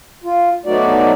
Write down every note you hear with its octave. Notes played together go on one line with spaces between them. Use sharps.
F4
F#3 A3 B3 D#4 F#4 D5